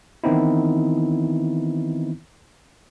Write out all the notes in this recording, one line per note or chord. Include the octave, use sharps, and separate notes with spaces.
D#3 E3 B3 C4 D#4 E4